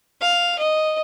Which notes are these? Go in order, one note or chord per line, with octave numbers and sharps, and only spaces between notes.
F5
D#5